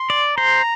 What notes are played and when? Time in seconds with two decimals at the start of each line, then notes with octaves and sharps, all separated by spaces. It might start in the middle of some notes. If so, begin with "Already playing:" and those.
Already playing: C6
0.10 D5
0.38 C5 A#5